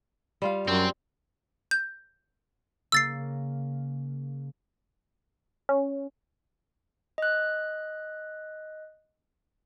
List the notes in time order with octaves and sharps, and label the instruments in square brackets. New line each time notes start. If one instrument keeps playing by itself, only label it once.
[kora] G3 F4 F5
[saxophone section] F#2 [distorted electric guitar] C4
[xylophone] G6
[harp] C#3 A#3 [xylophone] E6 A6 C7
[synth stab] C#4
[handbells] D#5 F#6